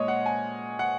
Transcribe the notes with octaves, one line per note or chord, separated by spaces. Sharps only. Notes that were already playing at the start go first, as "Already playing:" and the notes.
Already playing: A#2 G#3 C#5 D#5
F#5
G#5
F#5